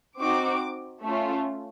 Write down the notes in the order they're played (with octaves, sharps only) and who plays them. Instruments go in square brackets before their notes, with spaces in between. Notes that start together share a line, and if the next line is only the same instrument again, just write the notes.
[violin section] C4 D#4 F#4 D6
A3 C#4 F4